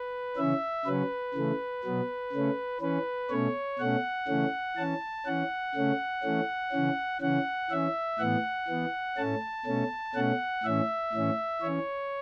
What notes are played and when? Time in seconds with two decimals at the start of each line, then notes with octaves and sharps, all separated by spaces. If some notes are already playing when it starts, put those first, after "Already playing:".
Already playing: B4
0.36 C#3 E3 C#4 E5
0.86 C#3 F#3 C#4 B4
1.34 C#3 E3 A3
1.84 B2 F#3 B3
2.33 C#3 A3 C#4
2.81 E3 C#4 B4
3.30 B2 A3 C#4 C#5
3.79 B2 A3 C#4 F#5
4.28 C#3 E3 A3 C#4
4.77 E3 C#4 A5
5.26 E3 C#4 F#5
5.75 C#3 A3 C#4
6.23 E3 A3 C#4
6.72 C#3 E3 C#4
7.21 C#3 E3 C#4 F#5
7.70 E3 C#4 E5
8.19 A2 E3 B3 F#5
8.69 E3 B3
9.17 A2 A3 C#4 A5
9.66 B2 A3 C#4
10.15 B2 A3 C#4 F#5
10.63 A2 E3 C#4 E5
11.13 A2 E3 C#4
11.62 E3 C#4 C#5